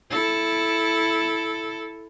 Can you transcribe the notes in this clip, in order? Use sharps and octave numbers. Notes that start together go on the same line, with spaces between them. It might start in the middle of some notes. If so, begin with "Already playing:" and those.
E4 A4